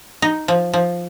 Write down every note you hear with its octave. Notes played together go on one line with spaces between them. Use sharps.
D#4
F3
F3